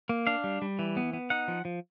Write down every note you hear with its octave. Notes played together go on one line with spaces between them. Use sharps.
A#3
D4 F5
G3
G3
E3
B3
B3
D#4 F#5
F3
F3